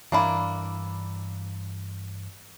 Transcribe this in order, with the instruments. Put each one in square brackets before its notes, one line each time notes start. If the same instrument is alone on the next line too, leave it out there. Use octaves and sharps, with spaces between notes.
[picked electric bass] G2 E3 [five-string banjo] A#3 D4 E4